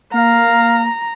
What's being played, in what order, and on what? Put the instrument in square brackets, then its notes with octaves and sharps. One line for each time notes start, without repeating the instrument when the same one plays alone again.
[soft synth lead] A#3 [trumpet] F5 [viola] A#5